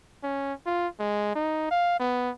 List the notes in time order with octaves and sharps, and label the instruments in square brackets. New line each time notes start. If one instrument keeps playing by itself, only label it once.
[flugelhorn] C#4
F4
G#3
D#4
F5
B3